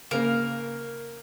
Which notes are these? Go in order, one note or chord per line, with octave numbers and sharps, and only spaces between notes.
C#3 A#3 A#4